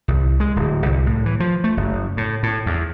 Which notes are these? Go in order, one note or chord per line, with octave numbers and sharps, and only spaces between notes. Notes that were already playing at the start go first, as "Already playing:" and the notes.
C2
G#3
D1
C2
A2
E3
F3
A3
F#1
A2
A2
E2